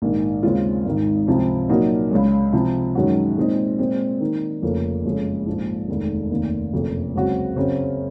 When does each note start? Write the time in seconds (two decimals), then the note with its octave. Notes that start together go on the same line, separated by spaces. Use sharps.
0.02 A#1 G#2 D#3 A#3
0.43 D#2 C#3 G#3 C4 F4
0.85 G#1 G#2 D#3
1.27 C#2 C3 F3 C4
1.69 A#2 F#3 A#3 D#4 F#4
2.11 C#2 C#3 G#3
2.53 C3 F3 C4
2.95 F#2 D#3 G#3 C#4 F#4
3.37 A#2 G#3 C4 D#4
3.79 A#2 G#3 C4
4.20 D#3 A#3 D#4
4.62 F1 F2 C#3 F3 A#3
5.05 F#1 F2 C#3 G#3
5.46 A#1 G#2 F3
5.88 F1 D#2 D#3 G#3
6.31 F1 D#2 D#3 A#3
6.73 F#1 F2 C3
7.14 C#2 C#3 F#3 C4 F#4
7.56 F#2 C#3 F#3 C4